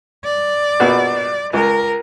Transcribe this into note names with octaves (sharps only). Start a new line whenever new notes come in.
D5
A#1 B2 F#4
C#2 A#4